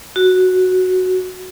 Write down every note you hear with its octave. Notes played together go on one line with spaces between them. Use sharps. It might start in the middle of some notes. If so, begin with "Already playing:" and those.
F#4